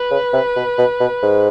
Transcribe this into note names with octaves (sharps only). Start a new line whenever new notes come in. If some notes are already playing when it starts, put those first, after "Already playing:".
Already playing: B4
C#3
C3
B2
B2
B2
G#2